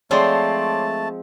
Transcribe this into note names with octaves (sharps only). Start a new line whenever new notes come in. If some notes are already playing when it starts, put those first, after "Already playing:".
F3 G#3 A3 C4 C#5 D5 A5 C6